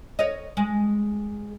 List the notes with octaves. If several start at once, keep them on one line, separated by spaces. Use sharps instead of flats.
C#5 D#5
G#3